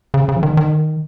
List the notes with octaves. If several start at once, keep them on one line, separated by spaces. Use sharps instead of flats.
C#3
C#3
F3
D#3
D#3